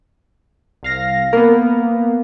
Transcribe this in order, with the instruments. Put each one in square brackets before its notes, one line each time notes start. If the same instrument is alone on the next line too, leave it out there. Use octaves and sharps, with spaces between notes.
[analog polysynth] C2 F5 A#6
[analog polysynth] A#3 B3 [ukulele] A#4